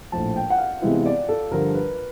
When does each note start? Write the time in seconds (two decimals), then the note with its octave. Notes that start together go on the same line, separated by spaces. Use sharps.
0.12 A#1 A2 F3 A5
0.36 G5
0.50 F#5
0.58 F5
0.82 C3 E3 G#3 B3 E4
1.06 D5
1.29 A4
1.51 G2 D3 F3 A#4
1.75 B4